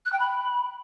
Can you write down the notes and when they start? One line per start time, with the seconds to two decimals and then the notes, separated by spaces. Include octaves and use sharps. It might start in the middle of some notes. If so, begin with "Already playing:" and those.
0.06 F#6
0.13 G5
0.20 B5